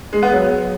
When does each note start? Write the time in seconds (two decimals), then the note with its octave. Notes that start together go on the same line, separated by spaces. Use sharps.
0.13 G#3
0.22 B3
0.32 F#3